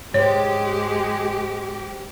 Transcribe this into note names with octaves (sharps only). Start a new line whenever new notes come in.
G#2 G#3 G4 C5 C#5